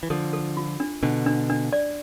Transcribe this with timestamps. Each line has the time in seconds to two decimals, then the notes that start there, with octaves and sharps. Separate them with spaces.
0.03 E3
0.10 D3 F3 A4
0.33 A4
0.57 F4
0.80 D4
1.03 B2 D3 D4
1.26 D4
1.49 D4
1.73 D5